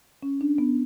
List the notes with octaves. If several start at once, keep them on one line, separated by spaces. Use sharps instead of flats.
C#4
D4
B3